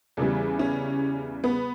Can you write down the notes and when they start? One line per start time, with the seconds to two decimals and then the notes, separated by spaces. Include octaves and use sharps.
0.17 E2 C#3 E3 G3
0.59 C#4
1.44 B3